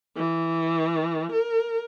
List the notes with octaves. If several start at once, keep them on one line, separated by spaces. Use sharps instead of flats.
E3
A#4